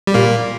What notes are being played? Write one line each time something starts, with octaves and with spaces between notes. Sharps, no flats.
G3
A#2 A#3